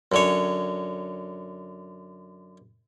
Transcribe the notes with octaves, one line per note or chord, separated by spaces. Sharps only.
F#2 D3 C#5